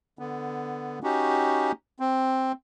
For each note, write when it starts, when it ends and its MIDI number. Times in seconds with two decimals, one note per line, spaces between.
0.19 0.99 50
0.19 0.99 59
1.03 1.72 61
1.03 1.72 63
1.03 1.72 66
1.03 1.72 67
2.00 2.52 60